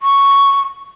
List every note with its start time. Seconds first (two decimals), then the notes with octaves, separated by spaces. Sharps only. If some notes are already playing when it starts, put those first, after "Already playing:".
0.02 C#6